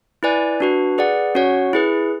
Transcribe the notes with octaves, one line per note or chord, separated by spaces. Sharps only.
E4 B4 D5 G#5
D4 F#4 B4
G#4 B4 D5 F#5
C#4 F#4 C#5 F#5
E4 G#4 B4